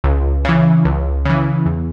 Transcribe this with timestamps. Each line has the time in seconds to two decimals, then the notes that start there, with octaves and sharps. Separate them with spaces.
0.04 C#2
0.45 C#3 E3
0.85 C#2
1.25 C#3 E3
1.66 E2